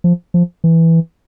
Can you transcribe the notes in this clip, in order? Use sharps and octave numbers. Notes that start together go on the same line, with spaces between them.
F3
F3
E3